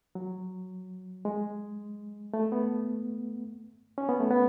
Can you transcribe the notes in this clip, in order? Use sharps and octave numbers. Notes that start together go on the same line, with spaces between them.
F#3
G#3
A3
B3
C#4
B3
A3
B3